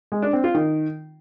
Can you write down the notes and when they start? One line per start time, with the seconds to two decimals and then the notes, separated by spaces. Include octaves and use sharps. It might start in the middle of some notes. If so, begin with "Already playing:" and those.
0.12 G#3
0.22 D4
0.33 C4
0.44 F4
0.55 D#3